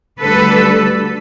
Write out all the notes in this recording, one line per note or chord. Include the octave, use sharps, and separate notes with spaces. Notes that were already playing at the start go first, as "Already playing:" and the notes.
D2 D3 G3 A4 B4